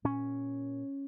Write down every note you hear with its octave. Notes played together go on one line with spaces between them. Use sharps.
A#2 C#4